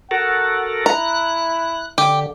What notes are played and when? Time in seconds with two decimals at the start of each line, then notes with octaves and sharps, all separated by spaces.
0.11 F#4 A4 A#4 F#5
0.86 E4 A#5 F#6
1.98 D3 G4